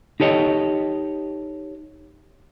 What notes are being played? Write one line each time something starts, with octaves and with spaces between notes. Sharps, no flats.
D#4 G4 A4 C#5 D#5